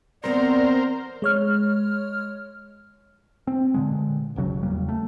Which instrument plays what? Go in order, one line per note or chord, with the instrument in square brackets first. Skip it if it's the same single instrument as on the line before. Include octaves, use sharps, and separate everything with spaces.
[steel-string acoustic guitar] E2 C4 [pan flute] B3 [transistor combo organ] A#4 C5 [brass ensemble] D5
[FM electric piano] G#3 C#5 F6
[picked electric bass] C4
A#2 D3 G#3
D1 G1 C#3 F#3
E2 F#3 G3 A#3
A3